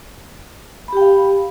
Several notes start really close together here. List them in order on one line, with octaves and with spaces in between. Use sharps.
B5 G4 G5 F5